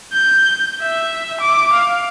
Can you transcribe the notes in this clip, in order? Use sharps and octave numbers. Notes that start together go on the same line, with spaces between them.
G6
E5
D6
F5